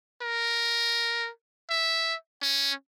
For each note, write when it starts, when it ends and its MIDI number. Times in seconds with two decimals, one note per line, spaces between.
0.22 1.30 70
1.70 2.15 76
2.43 2.73 61